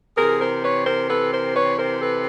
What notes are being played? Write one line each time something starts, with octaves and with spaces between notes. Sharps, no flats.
C3 E3 G#4 A#4
A#4 C5
B4 C#5
A#4 C5
A4 B4
A#4 C5
B4 C#5
A#4 C5
A4 B4